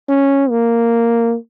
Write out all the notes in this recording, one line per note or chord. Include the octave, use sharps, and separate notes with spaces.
C#4
A#3